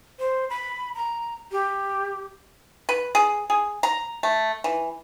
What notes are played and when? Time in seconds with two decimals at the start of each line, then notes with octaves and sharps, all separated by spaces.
0.19 C5
0.50 B5
0.95 A#5
1.52 G4
2.89 B4
3.15 G#4
3.50 G#4
3.83 A#5
4.23 A3
4.64 E3